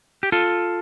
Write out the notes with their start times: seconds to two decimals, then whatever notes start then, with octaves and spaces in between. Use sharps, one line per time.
0.23 G4
0.32 F4 A4